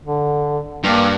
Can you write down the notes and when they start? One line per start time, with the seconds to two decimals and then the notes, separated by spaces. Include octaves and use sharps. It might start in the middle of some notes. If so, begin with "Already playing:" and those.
0.05 D3
0.84 G2 A#3